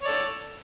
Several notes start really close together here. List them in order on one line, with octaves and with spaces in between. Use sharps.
C#5 D5 A4